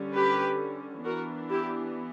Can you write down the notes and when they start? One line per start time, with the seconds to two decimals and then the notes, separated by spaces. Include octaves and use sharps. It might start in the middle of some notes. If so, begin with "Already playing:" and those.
Already playing: D3 G3 C#4
0.15 G4 B4
1.04 E3 B3 D4 F#4 A#4
1.50 E4 G4